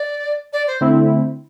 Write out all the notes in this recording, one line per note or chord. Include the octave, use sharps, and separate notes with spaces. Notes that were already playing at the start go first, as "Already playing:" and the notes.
Already playing: D5
D5
C5
D3 A3 C4 E4